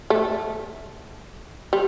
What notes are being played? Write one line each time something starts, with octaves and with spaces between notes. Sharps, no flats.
A3
G3